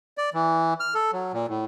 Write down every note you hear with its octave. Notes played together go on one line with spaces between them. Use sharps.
D5
E3
F6
A4
F#3
A#2
A2